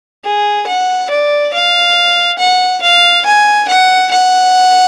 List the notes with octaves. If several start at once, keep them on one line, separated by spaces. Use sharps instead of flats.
G#4
F#5
D5
F5
F#5
F5
G#5
F#5
F#5